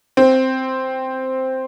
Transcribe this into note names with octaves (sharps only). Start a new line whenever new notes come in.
C4